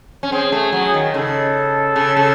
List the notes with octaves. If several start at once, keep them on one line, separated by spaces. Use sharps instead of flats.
C#4
C4 G#4
A3
F#3
D#3
C#3 A4
C#3
C#3